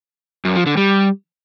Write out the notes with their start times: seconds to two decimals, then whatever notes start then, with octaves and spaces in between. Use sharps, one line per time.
0.45 F#2
0.55 F3
0.66 D3
0.77 G3